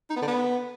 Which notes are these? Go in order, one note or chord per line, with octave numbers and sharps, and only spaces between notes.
D#4
B3
D3
B3